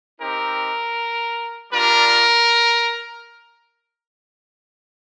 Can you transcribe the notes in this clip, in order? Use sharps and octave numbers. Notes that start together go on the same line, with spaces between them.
C4 D#4 G4 A#4
G3 D4 F4 A#4